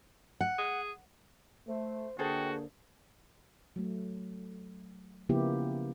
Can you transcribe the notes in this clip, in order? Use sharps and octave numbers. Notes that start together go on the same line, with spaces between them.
F#5
G#4
A3 C5
D3 A#3 F#4 G#4 A4 C5 G5
F#3 A3
C#3 F3 A#3 B3 E4 G4